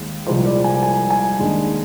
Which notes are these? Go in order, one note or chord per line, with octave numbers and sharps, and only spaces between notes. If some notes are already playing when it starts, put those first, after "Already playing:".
Already playing: D#2 G#3
C2 A#2 F3 G#3 C5
D5
G#5
G#5
G#5
D#2 D#3 G#3 D4